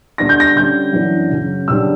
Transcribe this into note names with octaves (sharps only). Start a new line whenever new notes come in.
D3 G3 B3 D4 A#6
G6
A#6
D3 G3 C#4 G6
F#2 E3 B3 D4
C#3 F#3 C#4
F#2 C#3 G3 B3 D4 E6